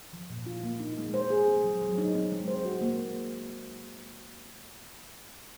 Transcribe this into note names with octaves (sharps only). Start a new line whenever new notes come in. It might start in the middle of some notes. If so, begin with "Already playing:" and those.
F3
A#2
F4
A#3
D#4
G#3
C5
G#4
C4
F#3
F#3
D#4
C4
G#3
C5
F#4
A#3